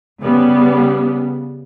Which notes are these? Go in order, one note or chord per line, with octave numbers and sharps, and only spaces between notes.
C#3 G3 B3